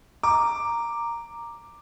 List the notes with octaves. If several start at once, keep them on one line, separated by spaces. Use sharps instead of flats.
A#5 D6